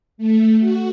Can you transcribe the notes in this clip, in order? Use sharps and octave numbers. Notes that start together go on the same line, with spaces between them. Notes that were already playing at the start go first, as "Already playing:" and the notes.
A3
F#4